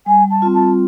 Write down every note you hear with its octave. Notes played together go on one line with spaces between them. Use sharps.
G3 G#5
A5
C4 F4
A5